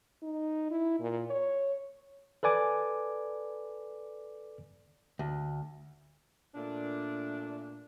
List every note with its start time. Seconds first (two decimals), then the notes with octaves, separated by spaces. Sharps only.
0.23 D#4
0.71 E4
1.00 A#2
1.30 C#5
2.43 A4 B4 D5 G#5 D6
5.19 D2
6.55 A#2 A3 D4